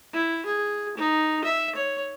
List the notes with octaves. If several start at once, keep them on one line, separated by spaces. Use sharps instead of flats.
E4
G#4
D#4
E5
C#5